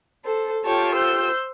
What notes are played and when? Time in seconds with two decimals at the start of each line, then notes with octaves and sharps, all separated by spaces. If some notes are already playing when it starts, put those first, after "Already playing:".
0.23 A4 C5
0.64 F4 G4 A4 C#5 G5 A5
0.95 C5 E6 G6